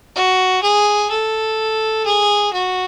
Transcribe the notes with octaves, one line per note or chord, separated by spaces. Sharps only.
F#4
G#4
A4
G#4
F#4